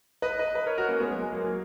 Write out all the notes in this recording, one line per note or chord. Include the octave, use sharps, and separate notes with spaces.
B4 D#5
B4 D#5
B4 D#5
A#4 C#5
F#4 A#4
A#3 C#4
G#3 B3
F#3 A#3
G#3
F#3 A#3
F#3 A#3